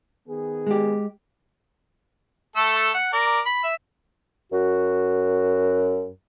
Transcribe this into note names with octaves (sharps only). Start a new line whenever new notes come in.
D#3 B3 G#4
G#3 G4
A3 A4 E6
F#5
A#4 D5
B5
E5
F#2 F#4